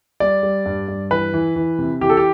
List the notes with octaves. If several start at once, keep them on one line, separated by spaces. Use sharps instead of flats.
G3 D5
G3
G2
G2
E3 B4
E3
E3
C3
E3 G4
A4
G4